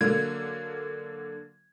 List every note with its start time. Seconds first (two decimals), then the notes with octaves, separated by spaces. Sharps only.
0.01 D3 F#3 A#3 G#6